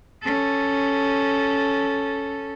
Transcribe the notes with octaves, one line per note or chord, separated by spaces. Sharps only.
C#4 A4